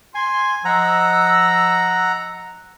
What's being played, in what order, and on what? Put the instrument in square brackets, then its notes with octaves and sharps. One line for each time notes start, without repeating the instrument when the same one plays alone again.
[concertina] G#5 [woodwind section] C6
[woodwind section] F3 D#5 E6 [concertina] F#5 A#5